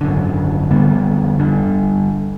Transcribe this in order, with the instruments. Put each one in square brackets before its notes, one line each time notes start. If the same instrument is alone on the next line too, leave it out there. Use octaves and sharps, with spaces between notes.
[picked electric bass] G#1 F#2 D3
F2 D3 G3 B3
G1 G2 D3